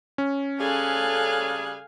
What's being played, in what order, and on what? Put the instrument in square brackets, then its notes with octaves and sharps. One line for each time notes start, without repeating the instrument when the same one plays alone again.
[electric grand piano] C#4
[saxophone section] C#3 G3 G#4 [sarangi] A4 [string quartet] F5 G#5 F#6